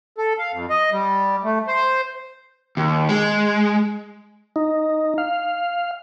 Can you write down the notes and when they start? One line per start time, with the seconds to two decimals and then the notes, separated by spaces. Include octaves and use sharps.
0.18 A4
0.38 F5
0.52 F2
0.70 D#5
0.92 G3
1.44 A3
1.68 C5
2.77 D#2
3.09 G#3
4.56 D#4
5.18 F5